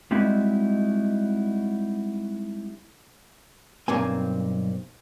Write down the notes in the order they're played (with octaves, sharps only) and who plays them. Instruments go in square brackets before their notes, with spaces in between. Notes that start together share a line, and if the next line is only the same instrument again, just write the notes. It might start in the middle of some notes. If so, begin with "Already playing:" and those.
[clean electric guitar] G3 G#3 C4 D#4 E4 F#4
[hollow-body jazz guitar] B1 G2 A#3 C4 G#5